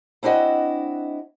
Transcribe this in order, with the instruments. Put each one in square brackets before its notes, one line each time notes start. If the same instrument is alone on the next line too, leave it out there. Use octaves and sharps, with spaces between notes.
[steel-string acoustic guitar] C4 D4 E4 F#4 D#5 F#5